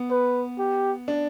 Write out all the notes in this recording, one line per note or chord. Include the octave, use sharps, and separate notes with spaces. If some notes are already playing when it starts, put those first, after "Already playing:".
Already playing: B3
B4
G4
D4